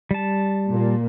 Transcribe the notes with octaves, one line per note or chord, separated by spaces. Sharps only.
G3 A5
A#2 A#3